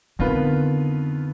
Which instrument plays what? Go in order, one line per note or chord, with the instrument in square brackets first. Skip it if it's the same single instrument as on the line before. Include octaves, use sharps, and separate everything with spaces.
[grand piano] F2 D#3 B3 F4 B4 [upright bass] D3